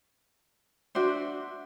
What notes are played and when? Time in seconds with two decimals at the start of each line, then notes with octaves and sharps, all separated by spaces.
0.95 D4 F#4 C5 E5